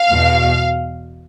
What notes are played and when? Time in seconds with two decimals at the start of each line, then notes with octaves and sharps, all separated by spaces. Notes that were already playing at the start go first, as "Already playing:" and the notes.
Already playing: F5
0.09 E2 B2